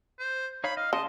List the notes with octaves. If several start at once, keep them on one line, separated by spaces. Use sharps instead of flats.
C5
D#4 C#5 F5 B5
D#5 F5
C#3 D#5 A5 C6